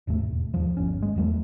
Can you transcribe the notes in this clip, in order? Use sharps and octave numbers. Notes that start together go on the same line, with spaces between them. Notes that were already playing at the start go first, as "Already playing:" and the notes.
F#1 D#2 G#2 A3
E1
D#2 F3
G1 C#4
G#3
E2 F#3 A3